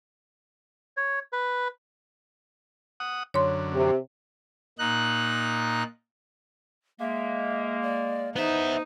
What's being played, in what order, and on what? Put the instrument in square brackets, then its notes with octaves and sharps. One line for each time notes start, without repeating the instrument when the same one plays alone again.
[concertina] C#5
B4
[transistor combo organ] F#5 D#6
[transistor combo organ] F#2 D3 [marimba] C#5 C6
[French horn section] C3
[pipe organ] A#2 D#4 F#6
[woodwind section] G#3 A#3 [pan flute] E5
[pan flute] D5
[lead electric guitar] B3 E5 [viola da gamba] D#4 [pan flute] C5